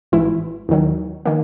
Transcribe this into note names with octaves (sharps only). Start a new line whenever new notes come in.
A1 G#2 E3 E4
D#2 D#3 F#3
D#3 A#3